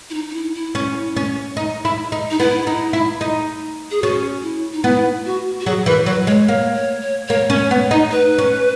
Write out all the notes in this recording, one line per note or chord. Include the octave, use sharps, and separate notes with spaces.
E4
D#4
D#4
E4
E4
C#4
C#4
D#4
E4
D#4
D#4
B3 E4
D#4
E4
D#4
G#4
C#4 F#4
E4
D#4
B3 E4
F#4
F#4
F#3 G#4
E3 A#4
F#3 B4
B4
G#3 C#5
A#3 C#5
C#5
C#5
A#3 C#5
C#4
C#5
B3
D#4
B4
C#4